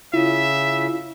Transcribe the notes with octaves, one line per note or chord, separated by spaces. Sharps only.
C#3 E4 F4 E5